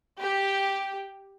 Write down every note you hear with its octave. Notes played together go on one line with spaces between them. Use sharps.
G4